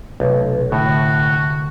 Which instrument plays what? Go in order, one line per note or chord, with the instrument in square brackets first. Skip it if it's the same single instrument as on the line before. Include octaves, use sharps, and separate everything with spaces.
[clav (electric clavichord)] B1 [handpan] C3 A3
[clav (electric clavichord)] A2 [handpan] D3 [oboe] F#4